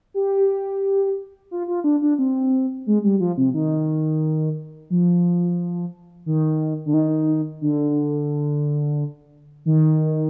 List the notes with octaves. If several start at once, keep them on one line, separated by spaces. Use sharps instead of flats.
G4
F4
F4
D4
D4
C4
G#3
G3
F3
C3
D#3
F3
D#3
D3
D#3
D3
D#3